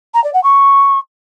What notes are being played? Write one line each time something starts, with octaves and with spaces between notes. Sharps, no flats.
A#5
D5
F#5
C#6